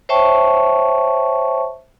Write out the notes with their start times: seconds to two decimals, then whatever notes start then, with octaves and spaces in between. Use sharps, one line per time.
0.09 C5 C#5 E5 G5 A5 C#6